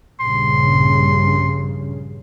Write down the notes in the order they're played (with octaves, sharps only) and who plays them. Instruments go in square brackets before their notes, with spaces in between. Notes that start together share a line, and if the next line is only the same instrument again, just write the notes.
[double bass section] A#1 G2 C#3 [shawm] C6